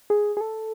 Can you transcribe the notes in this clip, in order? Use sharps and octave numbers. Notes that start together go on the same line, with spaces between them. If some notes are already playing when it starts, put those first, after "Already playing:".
G#4
G#4
A4